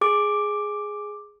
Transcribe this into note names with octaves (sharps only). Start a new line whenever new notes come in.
G#4 D6